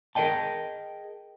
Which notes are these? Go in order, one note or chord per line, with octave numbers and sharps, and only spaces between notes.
G#4 A#4 D5 D#5 G5 A5